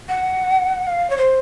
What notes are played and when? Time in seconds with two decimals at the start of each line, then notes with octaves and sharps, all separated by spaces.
0.09 F#5
0.87 F5
1.10 C#5
1.18 C5